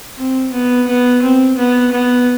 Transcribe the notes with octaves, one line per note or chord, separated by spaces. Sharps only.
C4
B3
B3
C4
B3
B3